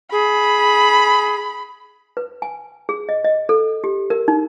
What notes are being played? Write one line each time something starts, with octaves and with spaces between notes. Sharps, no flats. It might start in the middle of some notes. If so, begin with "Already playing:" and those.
G#4 B5
B4
G#5
G#4
D#5
D#5
A4
G4
A#4
D#4